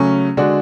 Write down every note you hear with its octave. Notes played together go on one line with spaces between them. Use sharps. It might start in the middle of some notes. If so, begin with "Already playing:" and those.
Already playing: C#3 F#3 A3 C#4
D3 G#3 D4 F#4